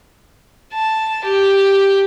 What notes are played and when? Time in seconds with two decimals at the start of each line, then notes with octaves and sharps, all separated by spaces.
0.73 A5
1.24 G4